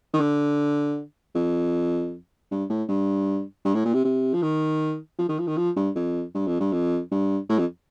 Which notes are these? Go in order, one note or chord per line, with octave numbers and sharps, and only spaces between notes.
D#3
D3
F2
G2
A2
G2
G2
A2
A#2
C3
C3
F3
D#3
F3
D#3
F3
D#3
F3
G2
F2
G2
F2
G2
F2
G2
A2
F2